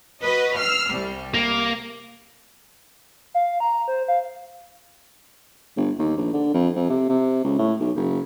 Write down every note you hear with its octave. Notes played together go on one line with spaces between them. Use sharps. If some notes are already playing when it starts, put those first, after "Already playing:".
F#4 B4 D#5
E6 F6 C7
C2 G3
A#3
F5
A#5
C5
F5
G1
D#2
A#1
D3
F2
F2
C3
C3
C#2
A2
B1
F#1